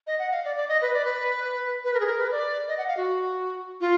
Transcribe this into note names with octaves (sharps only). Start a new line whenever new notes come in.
D#5
F#5
F5
D5
D5
D#5
B4
D5
B4
B4
A#4
G#4
A#4
B4
D5
D#5
F#5
F5
F#4
F4